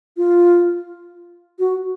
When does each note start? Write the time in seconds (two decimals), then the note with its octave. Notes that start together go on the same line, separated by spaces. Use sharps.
0.17 F4
1.59 F#4